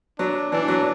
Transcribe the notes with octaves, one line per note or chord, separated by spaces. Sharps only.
F#3 D4
E3 D4
F#3